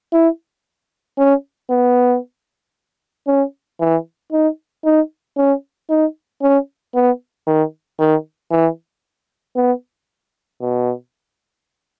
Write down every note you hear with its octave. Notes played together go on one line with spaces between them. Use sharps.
E4
C#4
B3
C#4
E3
D#4
D#4
C#4
D#4
C#4
B3
D#3
D#3
E3
B3
B2